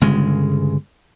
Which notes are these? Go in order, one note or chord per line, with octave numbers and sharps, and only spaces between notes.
G1 C#3 G#3